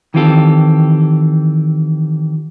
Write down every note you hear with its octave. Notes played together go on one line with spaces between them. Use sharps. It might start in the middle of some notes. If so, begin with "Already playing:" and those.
D#3 E3 C4 F4 G4 A4